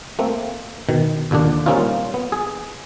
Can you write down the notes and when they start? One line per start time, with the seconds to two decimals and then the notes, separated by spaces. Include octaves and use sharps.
0.19 A3 A#3 C4
0.89 B2 D#3
1.31 D#2 A#2 D3 D4
1.66 G3 A#3 C4 C#4 D#4 F4
2.14 B3
2.32 G#4